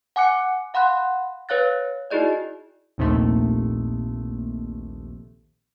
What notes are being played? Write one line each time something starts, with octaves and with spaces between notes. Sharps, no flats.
F#5 G#5 D6 F#6 C#7
F5 F#5 B5 C6 F#6
B4 C#5 F5 F#6 A6
D#4 E4 F#4 G#4 D5 D#5
A#1 D#2 C3 D#3 A3